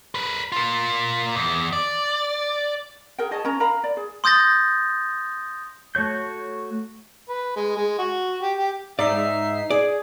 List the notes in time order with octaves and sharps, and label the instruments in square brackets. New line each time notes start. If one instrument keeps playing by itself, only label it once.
[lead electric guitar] A#4 B4
F4 A#4
E2
D5
[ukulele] G#4 A#4 G5
G#4 C#5 D#5 A5
C#4 A#4 A#5
A#4 F5 A#5 B5
D5
G#4
[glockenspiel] C6 D#6 G6 A6 A#6
[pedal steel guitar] A3 F#4 C#5 G6
[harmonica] B4
G#3
G#3
F#4
G4
G4
[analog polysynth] G#2 D#4 C7 [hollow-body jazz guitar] D5 [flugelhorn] E5
[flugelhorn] G#4 [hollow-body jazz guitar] D5